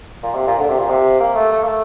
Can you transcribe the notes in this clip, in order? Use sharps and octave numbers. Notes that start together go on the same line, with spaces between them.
A#2
C3
A#2
D3
C3
A#2
C3
A#3
A3
A3
A#3
A3